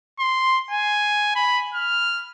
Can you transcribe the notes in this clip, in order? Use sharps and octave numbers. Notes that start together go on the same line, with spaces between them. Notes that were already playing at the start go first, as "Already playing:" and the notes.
C6
G#5
B5
F6